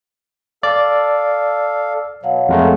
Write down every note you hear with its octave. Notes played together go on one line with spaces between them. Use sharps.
A4 D5 F5
B2 F#3 C#5 F5 F#5
F2 G#3 A3 A#4